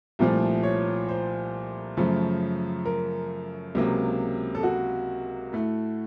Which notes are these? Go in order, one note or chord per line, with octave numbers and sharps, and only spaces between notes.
C2 A#2 F3 A3
C#5
C5
F#2 C#3 F3 A3
A#4
C#2 C3 F#3 A#3
A4
F#4
A2 A3